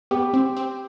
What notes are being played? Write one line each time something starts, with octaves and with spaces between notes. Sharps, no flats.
B3 G4
C4
C4